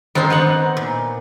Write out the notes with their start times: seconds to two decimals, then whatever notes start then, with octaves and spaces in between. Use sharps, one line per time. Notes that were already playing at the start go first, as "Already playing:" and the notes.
0.15 D#3 C4 D4 D#4 C5
0.30 B3 D#4 F#5
0.77 A#2